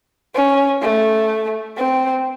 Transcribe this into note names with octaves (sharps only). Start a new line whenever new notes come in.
C#4
A3
C4